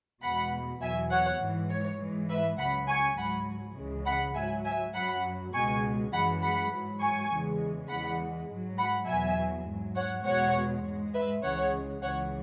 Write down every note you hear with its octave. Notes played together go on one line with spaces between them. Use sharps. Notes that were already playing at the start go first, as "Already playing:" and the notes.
E2 B2 G#3 F#5 B5
E2 B2 F#3 E5 G#5
C#5 F#5
G#2 E3 G#3
C#5
G#2 E3 G#3
B4 E5
C#2 C#3 F#3 F#5 B5
G#5 C#6
G#2 F#3 F#5 B5
C#2 C#3 E3 G#3
F#5 B5
G#2 F#3 E5 G#5
E5 G#5
F#2 F#3 F#5 B5
C#2 B2 G#3 G#5 C#6
F#2 E3 G#3 F#5 B5
F#5 B5
G#2 F#3
G#5 C#6
E2 C#3 E3 G#3
E2 E3 G#3 F#5 B5
G#2 F#3
F#5 B5
E2 B2 F#3 E5 G#5
G#2 F#3
C#5 F#5
E2 B2 G#3 C#5 F#5
G#2 G#3
B4 E5
C#2 C#3 E3 G#3 C#5 F#5
C#2 C#3 E3 C#5 F#5